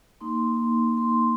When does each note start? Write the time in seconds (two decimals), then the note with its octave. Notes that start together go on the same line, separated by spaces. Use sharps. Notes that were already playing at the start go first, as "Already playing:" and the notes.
0.21 A#3 D#4 C6
0.97 C6